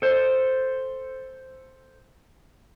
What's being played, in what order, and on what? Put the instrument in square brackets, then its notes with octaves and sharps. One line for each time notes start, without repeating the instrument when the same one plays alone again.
[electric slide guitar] A4 C5